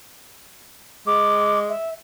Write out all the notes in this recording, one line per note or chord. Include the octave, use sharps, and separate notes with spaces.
G#3 D6
E5